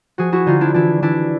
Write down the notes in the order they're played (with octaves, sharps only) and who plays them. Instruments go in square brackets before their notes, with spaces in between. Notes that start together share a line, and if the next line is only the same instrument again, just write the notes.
[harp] F3 F#4 G#4
E4 F#4
D3 D#4 F4
D4 E4
E3 D4 E4
E3 D4 E4